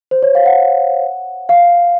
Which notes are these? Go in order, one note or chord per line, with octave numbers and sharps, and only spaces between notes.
C5
C#5
F5
F#5
F5